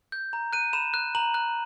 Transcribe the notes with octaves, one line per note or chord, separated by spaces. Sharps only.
G6
A#5
F#6 D#7
B5 E7
F#6
A#5 F#7
F#6